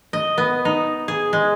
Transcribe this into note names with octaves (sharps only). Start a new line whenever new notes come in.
D#5
B3
D#4
G#4
G#3